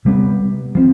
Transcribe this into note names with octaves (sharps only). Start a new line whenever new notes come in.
C3 G3 B3
F3 C4